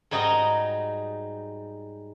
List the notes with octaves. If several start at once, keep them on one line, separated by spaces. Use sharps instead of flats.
G#2 G3 D#4 F#4 D#5 A#5